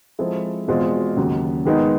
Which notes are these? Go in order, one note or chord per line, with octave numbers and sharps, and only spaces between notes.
F3 G#3 C4 E4 A4
E2 B2 G#3 C4 F4
D#2 C#3 F#3
D#3 G#3 B3 D#4